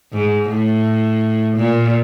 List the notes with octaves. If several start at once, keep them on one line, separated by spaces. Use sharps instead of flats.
G#2
A2
A#2